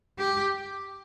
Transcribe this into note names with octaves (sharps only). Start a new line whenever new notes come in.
G4